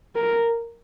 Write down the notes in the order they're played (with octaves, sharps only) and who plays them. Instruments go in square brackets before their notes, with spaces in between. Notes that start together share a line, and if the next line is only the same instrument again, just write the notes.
[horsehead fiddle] A#4